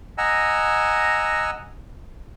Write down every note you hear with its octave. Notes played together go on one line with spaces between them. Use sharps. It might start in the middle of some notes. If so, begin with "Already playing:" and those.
D#5 F#5 G#5 A#5 E6